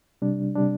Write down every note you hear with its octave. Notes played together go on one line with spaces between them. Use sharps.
C3 G3 D4
C3 G3 D4